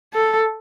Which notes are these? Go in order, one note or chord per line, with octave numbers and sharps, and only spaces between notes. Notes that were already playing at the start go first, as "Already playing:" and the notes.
A4